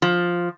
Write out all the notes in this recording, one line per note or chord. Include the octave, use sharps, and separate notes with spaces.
F3